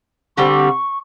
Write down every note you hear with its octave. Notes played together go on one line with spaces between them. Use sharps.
D3 G3 C4 C#6